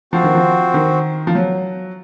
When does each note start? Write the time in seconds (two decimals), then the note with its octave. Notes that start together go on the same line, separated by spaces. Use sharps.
0.13 F3 C4 F#4 C5
0.23 D#3
0.35 F3
0.74 D#3
1.27 F3
1.35 F#3